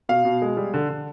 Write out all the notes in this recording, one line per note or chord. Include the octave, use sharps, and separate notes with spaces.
B2 F5
B2
G#3
G3
D3
D3